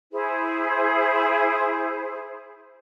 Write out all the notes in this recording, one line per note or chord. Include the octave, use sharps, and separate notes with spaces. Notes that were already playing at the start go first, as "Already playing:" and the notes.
E4 G#4 C5